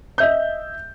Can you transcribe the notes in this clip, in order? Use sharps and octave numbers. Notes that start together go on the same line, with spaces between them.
D#5 E5 G6